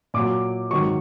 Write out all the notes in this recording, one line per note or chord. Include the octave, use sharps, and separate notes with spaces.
A#2 F#3 D6
G#2 D#3 F#3 C#6